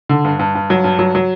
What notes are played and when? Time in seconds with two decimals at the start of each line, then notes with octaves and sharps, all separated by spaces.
0.09 D3
0.25 G2
0.39 G2
0.55 G2
0.70 F#3
0.84 G2
0.99 F#3
1.15 F#3